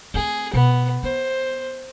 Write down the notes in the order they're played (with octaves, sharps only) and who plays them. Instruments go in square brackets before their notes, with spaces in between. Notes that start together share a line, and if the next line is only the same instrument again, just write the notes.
[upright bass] A3 C4 [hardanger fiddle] G#4
[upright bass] B2 [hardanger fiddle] B3
[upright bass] B3 [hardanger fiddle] C5